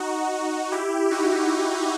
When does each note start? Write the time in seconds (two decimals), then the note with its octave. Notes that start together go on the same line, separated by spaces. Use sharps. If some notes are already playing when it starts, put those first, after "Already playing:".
Already playing: D#4 F#4
0.72 E4 G4
1.11 D#4 F#4